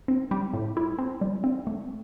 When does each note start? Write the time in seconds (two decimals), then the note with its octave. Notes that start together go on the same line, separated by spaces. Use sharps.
0.08 C4
0.31 G3
0.54 A2
0.77 E4
0.99 C4
1.21 G3
1.44 C4
1.67 A3